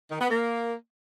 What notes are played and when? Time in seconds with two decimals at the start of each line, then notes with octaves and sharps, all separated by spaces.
0.10 D#3
0.20 B3
0.30 A#3